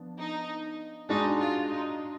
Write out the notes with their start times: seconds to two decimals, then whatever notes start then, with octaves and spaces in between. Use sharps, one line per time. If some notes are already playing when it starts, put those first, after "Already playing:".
Already playing: F3 B3 D4
0.19 D#4
1.09 G#3 D4 D#4 F#4
1.40 F4
1.69 D#4